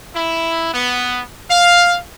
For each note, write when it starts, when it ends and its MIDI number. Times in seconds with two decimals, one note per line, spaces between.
0.15 0.71 64
0.74 1.23 59
1.50 2.00 77